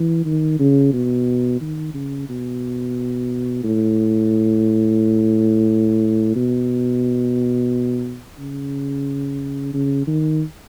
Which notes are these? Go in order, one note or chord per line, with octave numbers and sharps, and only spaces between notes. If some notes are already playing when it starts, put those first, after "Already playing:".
Already playing: E3
D#3
C#3
B2
D#3
C#3
B2
A2
B2
C#3
C#3
D#3